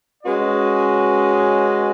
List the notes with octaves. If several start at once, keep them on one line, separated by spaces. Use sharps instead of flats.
G#3 C#4 F#4 B4 D#5